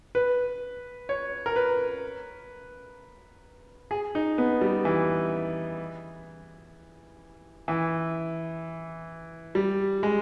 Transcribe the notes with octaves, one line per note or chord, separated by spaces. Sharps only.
B4
C#5
A#4
B4
G#4
D#4
B3
G3
E3
E3
G3
G#3